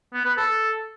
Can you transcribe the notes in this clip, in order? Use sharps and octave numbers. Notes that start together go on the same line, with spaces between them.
B3
B4
A4